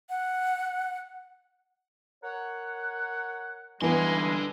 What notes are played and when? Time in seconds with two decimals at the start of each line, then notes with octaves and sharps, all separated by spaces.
0.10 F#5
2.23 A#4 C#5 F#5
3.82 G2 D3 E3 G3 G#3 B3 G#5 C6